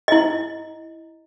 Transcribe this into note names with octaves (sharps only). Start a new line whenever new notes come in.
E4 D#5